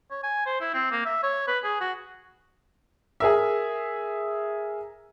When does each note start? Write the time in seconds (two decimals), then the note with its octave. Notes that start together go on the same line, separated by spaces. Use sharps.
0.11 C#5
0.23 G#5
0.46 C5
0.61 E4
0.74 C4
0.92 A#3
1.05 E5
1.23 C#5
1.48 B4
1.64 G#4
1.81 F#4
3.20 G#4 A#4 E5